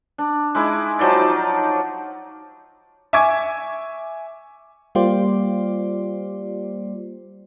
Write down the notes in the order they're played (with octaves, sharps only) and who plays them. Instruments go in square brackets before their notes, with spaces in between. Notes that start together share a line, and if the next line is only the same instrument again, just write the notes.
[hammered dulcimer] D4
G#3 D#4 E4 D6
F3 F#3 D#4 D5
[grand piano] E5 G#5 C#6 D6 G#6
[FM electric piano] G3 A#3 F4 G4 C5 D5